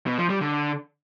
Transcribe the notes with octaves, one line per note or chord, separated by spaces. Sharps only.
B2
F3
G3
D3